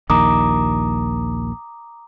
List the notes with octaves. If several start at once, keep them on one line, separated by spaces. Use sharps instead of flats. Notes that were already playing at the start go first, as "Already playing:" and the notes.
A#1 D#2 D#3 A#5 D6 D#6